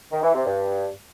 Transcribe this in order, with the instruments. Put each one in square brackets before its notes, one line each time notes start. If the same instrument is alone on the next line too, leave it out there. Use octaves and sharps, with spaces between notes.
[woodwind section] D#3
E3
C3
G2